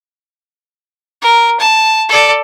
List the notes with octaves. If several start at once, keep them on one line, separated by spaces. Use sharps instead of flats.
A#4
A5
A4 D5